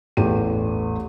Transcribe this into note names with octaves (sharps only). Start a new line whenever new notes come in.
A1 E2 A3 G4 D#7